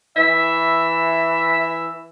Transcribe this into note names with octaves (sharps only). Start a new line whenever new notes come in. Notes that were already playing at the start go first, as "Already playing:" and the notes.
E3 E5